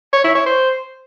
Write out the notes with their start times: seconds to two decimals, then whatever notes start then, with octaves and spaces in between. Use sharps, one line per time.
0.13 C#5
0.24 E4
0.35 C#5
0.46 C5